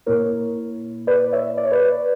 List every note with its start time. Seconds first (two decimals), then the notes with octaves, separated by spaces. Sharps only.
0.06 A#2 A#3 E4 A#4 C#5
1.07 B4 D5
1.32 C#5 E5
1.57 D5
1.65 C#5
1.71 B4 D5